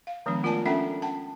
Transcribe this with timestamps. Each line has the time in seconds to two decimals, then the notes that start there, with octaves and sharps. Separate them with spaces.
0.07 F5
0.26 D#3 F3 G#3 B3 D4
0.43 A3 F4 A#4 D5 G#5 A5
0.65 C#4 D4 A4 E5 F#5 G5
1.02 F#5 G5 A5